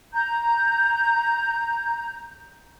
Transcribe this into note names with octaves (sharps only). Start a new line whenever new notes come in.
A#5 G6